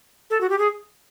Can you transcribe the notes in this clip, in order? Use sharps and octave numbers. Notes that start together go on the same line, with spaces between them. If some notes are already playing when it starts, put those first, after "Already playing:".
A4
F#4
G4
G#4